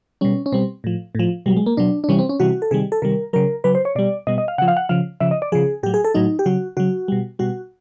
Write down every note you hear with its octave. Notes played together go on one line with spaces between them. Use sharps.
B2 G3 C#4
C#4
B2 G3 C4
A2 F3
A2 F3
B2 F#3 G3
G#3
A#3
B2 F#3 D4
D4
C3 E3 G3 C#4
C4
C#4
C3 E3 G3 F#4
A4
C3 D#3 G3 G#4
A4
C3 D#3 G3 A#4
C#3 F#3 A#4
C#3 F#3 B4
C5
C#5
B2 G3 D5
B2 G3 D#5
D#5
F5
C#3 F3 F#5
F5
F#5
C#3 F3 F5
C#3 F3 E5
D#5
D5
C#3 F3 G#4
A2 F#3 G4
G#4
A4
A2 F#3 D#4
G4
C#3 F#3 F#4
C#3 F#3 F#4
B2 G3
B2 G3 F#4